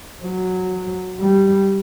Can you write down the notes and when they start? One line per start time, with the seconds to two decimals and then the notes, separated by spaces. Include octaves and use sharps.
0.24 F#3
1.19 G3